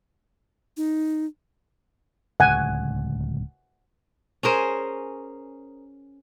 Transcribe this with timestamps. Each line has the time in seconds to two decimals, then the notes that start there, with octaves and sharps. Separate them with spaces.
0.77 D#4
2.40 D1 C#2 F#5 G#5
4.43 C#4 G#4 A#4 C5